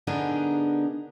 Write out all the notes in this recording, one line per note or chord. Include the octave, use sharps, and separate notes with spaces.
D3 B3 D4 D#4 G#4 A#4